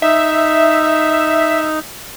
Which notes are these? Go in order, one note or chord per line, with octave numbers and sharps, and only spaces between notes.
D#4 E5